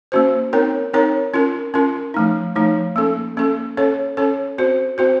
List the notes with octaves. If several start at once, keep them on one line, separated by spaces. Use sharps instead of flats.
A#3 C#4 F#4 C5
C4 D#4 A#4 C#5
C4 D#4 A#4 C#5
C#4 F4 A#4
C#4 F4 A#4
F3 A3 D#4
F3 A3 D#4
A#3 C#4 A4
A#3 C#4 A4
C#4 A4 C#5
C#4 A4 C#5
C4 F#4 C5
C4 F#4 C5